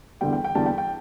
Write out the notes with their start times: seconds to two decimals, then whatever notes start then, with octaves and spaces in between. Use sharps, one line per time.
0.21 E2 D3 G3 G5
0.33 G5
0.44 G5
0.55 E2 D3 G3 A5
0.66 G5
0.78 G5